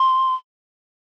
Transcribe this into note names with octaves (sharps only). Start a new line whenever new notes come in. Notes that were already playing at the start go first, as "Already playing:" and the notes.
Already playing: C6